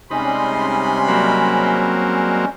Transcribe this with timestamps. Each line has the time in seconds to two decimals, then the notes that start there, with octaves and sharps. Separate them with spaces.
0.11 C3 G3 G#3 C#4 D#4 B5 C6
1.08 F#3 A#3 C4